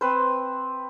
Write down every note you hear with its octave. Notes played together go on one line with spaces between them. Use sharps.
C4 B4 C5